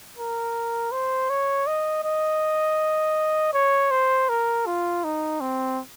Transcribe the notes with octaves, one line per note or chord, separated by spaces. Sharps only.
A#4
C5
C#5
D#5
D#5
C#5
C5
A#4
F4
D#4
C4